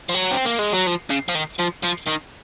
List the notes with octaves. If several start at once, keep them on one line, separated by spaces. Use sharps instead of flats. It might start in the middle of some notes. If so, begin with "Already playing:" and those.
F3
F#3
C4
A#3
G#3
F#3
F3
C#3
F3
D#3
F3
F3
D#3